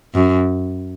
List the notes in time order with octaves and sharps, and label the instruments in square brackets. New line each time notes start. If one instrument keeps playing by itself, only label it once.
[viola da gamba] F#2